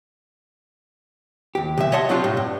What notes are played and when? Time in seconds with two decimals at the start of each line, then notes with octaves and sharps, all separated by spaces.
1.55 D#2 G4
1.77 B1 C3 E5
1.92 C#5 D#5 E5 F#5 A5 C6
2.09 C3 F#3 G3 D4 F4 G4
2.24 A2
2.37 G2